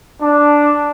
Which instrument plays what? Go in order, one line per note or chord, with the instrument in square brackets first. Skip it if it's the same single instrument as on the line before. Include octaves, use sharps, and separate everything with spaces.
[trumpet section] D4